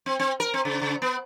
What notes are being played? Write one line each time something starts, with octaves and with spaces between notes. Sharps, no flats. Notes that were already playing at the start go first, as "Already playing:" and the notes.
C4
C4
A#4
C4
C#3
C#3
B3